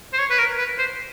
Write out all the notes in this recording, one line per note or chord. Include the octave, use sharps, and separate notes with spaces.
C5
C#5
B4
A#4
B4
C5